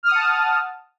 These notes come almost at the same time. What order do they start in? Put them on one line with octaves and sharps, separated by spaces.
F6 D#6 F#5 A5